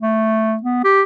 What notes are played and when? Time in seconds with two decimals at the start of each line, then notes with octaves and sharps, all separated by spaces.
0.01 A3
0.63 B3
0.84 G4